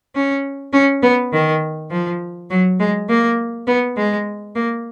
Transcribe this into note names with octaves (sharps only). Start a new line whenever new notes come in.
C#4
C#4
B3
D#3
F3
F#3
G#3
A#3
B3
G#3
A#3